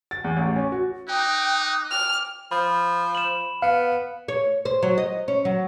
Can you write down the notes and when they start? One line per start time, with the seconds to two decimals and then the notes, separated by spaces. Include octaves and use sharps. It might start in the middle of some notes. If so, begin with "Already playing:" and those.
0.11 A6
0.24 E2
0.37 A1
0.56 C#4
0.72 F#4
1.08 D#4 G5 D6 D#6 F#6
1.91 G5 D6 F6
2.51 F3 B5
3.15 E7 F#7
3.62 B3 F5
4.28 C#5
4.65 C5
4.83 F#3
4.98 D#5
5.28 C#4
5.45 F#3